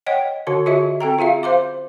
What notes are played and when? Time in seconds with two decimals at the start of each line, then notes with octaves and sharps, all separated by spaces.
0.07 C#5 D#5 F#5 G5
0.47 D3 F#4 C#5 C6
0.66 F4 F#4 G#4 C#5 D#5 E5
1.00 C4 A4 G5 A#5
1.19 F4 G#4 E5 F5
1.43 C5 F5 C6 D6